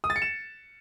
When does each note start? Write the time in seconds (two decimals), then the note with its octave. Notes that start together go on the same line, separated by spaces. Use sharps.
0.04 D#6
0.10 A6
0.16 C#7
0.22 E7